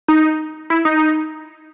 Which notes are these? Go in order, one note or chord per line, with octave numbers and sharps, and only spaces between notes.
D#4
E4
D#4